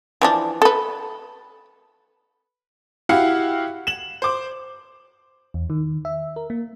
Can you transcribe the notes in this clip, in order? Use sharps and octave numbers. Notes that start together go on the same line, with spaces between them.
E3 F3 D4
A4 B4
E4 F#4 G4 F5 F#5
E7 F#7
C5 D6
E2
D#3
E5
A#4
A#3